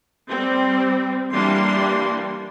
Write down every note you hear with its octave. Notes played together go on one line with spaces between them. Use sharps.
G3 C4
E3 G3 A#3 D4 C6